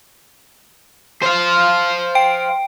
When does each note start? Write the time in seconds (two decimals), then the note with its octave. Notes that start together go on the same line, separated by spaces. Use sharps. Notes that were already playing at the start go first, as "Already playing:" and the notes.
1.23 C5 F5
2.15 G5 D7